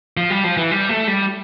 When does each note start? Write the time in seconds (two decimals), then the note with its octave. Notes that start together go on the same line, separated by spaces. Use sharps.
0.17 F3
0.30 G3
0.44 F3
0.57 E3
0.71 G3
0.89 A3
1.08 G3